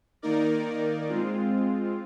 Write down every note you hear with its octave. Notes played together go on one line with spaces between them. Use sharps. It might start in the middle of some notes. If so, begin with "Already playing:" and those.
D#3 A#3 D#4 A#4 D5
G#3 C4 F4